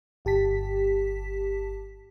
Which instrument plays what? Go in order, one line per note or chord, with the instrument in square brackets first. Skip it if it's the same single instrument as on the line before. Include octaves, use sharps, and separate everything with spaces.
[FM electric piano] G1 G4 A5 B6